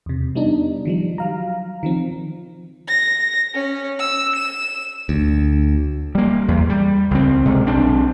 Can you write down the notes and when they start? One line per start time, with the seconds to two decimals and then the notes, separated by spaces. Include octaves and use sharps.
0.06 E2 C3
0.35 G3 B3 D4 D#4
0.85 D#3 F3 G3
1.18 F#3 F5 A#5
1.83 D#3 F3 C4
2.88 A#6
3.54 C#4
3.99 E6
4.35 E7
5.09 D2
6.15 G3 A#3
6.48 E2
6.70 G3
7.11 C#2 C4
7.45 C3 G#3
7.66 B1 C4 D4